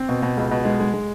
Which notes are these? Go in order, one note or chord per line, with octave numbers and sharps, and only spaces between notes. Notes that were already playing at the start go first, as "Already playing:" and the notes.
Already playing: C4
B2
B2
C#2
B2
G#3
G#3
G#3